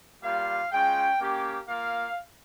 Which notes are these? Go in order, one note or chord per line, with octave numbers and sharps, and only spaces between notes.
G3 A#3 F4 F5
G#3 C#4 F4 G5
A#3 C#4 G4
A#3 F4 F5